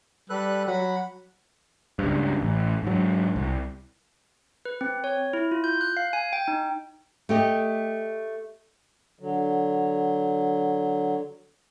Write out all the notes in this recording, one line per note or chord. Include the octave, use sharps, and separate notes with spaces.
G3 A4 B4 F#6
F#3 F#5 B5
C#2 G2
A1
G#2 F#3
C2
B4
C4
C#5
E4
F4
G6
F#6
F5
G#5
G5
D#4
A3 G4 D#5
D3 F#3